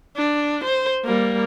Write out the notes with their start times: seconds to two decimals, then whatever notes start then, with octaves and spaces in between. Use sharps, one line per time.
0.16 D4
0.64 C5
1.04 G3 A#3